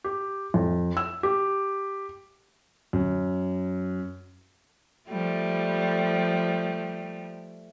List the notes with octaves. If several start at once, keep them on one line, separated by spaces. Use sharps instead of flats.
G4
F2
E6
G4
F#2
F3 G3 A3